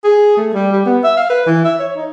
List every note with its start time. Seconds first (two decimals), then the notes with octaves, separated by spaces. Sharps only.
0.04 G#4
0.37 A3
0.54 G3
0.72 G3
0.86 B3
1.04 E5
1.17 F5
1.30 B4
1.46 E3
1.65 E5
1.80 C#5
1.96 D#4